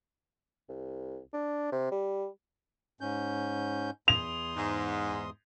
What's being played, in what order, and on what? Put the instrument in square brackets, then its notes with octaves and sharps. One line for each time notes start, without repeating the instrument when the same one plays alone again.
[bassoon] C2
D4
C3
G3
[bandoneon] G#2 C#4 G6
[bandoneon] E2 C6 D#6 [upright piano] F7
[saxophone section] G#2